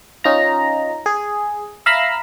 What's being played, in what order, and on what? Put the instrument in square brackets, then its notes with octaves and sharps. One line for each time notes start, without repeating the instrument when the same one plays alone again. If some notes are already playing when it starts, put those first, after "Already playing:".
[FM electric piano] C#4 D#4 F4 A#5
G#4
E5 F5 A#5 B5 E6 F6